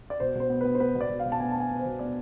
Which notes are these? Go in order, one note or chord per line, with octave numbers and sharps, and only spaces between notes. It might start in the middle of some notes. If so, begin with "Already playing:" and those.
D5
B2 C5
B2 C5
B3
B3 B4
C5
B3 B4
B2
D5
B2
F5
B2
A5
B3 G#5
A5
B3 G#5
B3
C5
B2
B3 D5